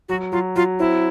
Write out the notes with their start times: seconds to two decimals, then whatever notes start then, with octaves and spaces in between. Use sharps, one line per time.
0.09 F#3 F#4
0.32 F#3 F4
0.56 F#3 F4
0.79 C4 E4